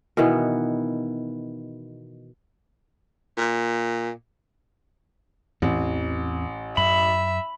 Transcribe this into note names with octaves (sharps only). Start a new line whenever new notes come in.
B2 D#3 E3 B3
A#2
A1 E2 E3 C4
F#2 E5 B5